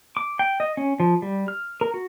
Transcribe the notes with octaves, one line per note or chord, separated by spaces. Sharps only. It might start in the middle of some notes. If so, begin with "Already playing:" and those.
D6
G5
D#5
C#4
F3
G3
F6
A#4
F#4